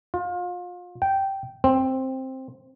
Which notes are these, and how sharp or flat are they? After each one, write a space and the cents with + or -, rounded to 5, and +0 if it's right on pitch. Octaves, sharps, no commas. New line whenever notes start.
F4 +30
G5 -10
C4 +5